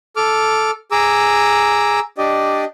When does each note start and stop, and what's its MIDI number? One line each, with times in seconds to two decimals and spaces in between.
0.16 0.71 69
0.16 0.71 86
0.16 0.71 89
0.91 2.00 68
0.91 2.00 82
0.91 2.00 86
0.91 2.00 88
2.18 2.65 62
2.18 2.65 67
2.18 2.65 74
2.18 2.65 75